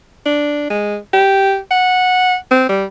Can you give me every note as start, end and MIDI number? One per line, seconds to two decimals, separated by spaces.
0.26 0.65 62
0.70 0.97 56
1.13 1.58 67
1.71 2.35 78
2.51 2.66 60
2.69 2.84 55